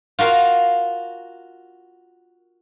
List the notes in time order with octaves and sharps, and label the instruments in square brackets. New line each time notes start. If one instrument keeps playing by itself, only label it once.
[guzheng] F4 F#4 A#4 F5